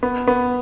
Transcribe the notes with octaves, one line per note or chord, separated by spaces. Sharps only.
B3
B3